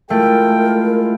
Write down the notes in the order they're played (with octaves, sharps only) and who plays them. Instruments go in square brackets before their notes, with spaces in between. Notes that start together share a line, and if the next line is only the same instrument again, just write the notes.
[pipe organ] G#3 E4 F4 [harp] A3 [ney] A#4 [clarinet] G5